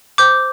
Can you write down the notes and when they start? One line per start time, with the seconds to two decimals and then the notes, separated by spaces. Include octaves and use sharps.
0.18 C5 D6 G6